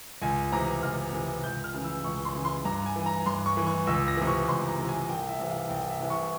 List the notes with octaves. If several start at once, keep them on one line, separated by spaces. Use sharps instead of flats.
C#2 G#5
C3 E3 A#5
C#2 F6
C3 E3
C#2 G6
F6
C#3 E3
E6
C#2 C#6
C6
C#3 E3
C6
G2 A#5
G#5
E3
A#5
G2 C6
C#6
E3
C#6
C#2 E6
A#6
C3 E3
C#6
C#2 C6
A#5
C3 E3
G#5
C2 G5
E5
C3 E3
F5
C2 G5
E5
C3 E3
C#6